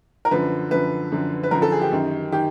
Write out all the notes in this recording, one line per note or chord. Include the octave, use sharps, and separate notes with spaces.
A#4
F#2 D3 F3 B4
F#2 D3 F3 B4
F#2 D3 F3
B4
F#2 D3 F3 A#4
A4
G#4
G4
F#2 D#3
D#3 G4